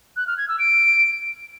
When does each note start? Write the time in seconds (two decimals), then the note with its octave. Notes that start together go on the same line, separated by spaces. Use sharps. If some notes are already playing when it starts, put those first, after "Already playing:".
0.16 F#6
0.27 F6
0.38 G#6
0.48 E6
0.59 D7